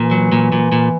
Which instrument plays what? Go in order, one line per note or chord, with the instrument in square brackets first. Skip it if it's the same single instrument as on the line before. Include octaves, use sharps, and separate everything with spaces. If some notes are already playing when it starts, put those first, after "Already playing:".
Already playing: [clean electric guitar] A#2 [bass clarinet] E3
[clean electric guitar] F#3
A#2
A#2
A#2